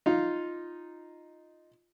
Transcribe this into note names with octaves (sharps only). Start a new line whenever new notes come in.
D#4 F4